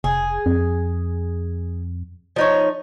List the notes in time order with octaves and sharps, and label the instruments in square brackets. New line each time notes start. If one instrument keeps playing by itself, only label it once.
[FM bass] F1 [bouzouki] G#4
[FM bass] F2
[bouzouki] F3 D#4 C#5